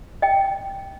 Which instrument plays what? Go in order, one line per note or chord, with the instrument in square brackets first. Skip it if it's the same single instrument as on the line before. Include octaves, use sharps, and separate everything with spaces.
[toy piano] D#5 G5